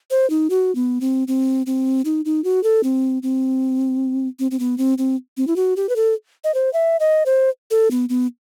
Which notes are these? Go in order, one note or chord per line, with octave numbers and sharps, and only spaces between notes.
C5
D#4
F#4
B3
C4
C4
C4
D#4
D#4
F#4
A4
C4
C4
C4
C4
B3
C4
C4
C4
E4
F#4
G4
B4
A4
D#5
C5
E5
D#5
C5
A4
B3
B3